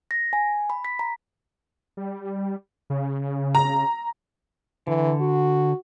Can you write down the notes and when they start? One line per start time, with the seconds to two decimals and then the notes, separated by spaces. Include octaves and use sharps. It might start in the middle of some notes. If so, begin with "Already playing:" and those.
0.11 A#6
0.33 G#5
0.70 B5
0.85 B6
0.99 A#5
1.97 G3
2.90 C#3
3.55 A#5
4.87 D3 E3
5.21 F#4